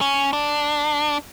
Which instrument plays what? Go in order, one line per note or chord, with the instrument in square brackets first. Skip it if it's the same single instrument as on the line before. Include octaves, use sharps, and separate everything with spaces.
[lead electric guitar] C#4
D4